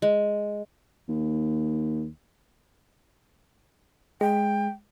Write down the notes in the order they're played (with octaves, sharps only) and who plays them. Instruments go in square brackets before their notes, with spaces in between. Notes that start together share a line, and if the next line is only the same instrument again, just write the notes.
[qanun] G#3
[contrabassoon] D#2
[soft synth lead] G#3 [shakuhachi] G5